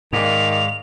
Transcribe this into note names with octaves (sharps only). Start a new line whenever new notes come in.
G#2 D#3 D5 F5 F7